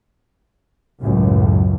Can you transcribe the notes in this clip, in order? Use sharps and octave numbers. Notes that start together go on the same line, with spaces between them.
C#2 F#2 A2